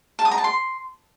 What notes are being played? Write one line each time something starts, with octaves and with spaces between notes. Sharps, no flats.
A5
D#6
A#5
A5
C6